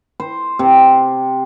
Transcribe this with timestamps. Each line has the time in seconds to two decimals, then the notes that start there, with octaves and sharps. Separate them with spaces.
0.20 C5
0.59 C3